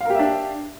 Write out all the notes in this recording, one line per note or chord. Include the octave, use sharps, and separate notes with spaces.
D4 G4 A#4 E5 F5